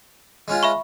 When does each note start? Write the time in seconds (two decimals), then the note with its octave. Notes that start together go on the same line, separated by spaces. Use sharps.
0.48 G#3 C#4 F4
0.63 E5 B5 C#6